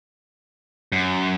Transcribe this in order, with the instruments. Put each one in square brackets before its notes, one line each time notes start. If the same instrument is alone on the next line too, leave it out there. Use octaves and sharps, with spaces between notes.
[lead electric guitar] F#2